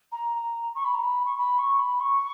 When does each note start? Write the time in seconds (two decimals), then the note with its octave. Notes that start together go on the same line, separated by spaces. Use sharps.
0.12 A#5
0.75 C#6
0.85 B5
0.94 A#5
1.03 B5
1.25 C#6
1.37 B5
1.58 C#6
1.79 B5
2.00 C#6